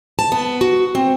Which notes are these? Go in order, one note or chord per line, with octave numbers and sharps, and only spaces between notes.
A5
B3
F#4
C4